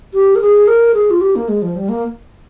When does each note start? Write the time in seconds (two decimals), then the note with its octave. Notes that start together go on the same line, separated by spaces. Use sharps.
0.14 G4
0.35 A#4
0.41 G#4
0.68 A#4
0.94 G#4
1.11 F4
1.21 G4
1.36 A#3
1.48 G#3
1.62 F3
1.76 G3
1.89 A#3